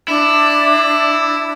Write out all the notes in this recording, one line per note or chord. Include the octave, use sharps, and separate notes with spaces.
D4 E4